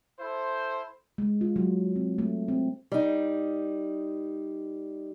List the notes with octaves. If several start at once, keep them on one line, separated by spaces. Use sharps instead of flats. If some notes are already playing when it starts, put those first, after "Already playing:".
E4 A4 C5
G#3
F4
F#3
C4
A3
C4
G3 D#4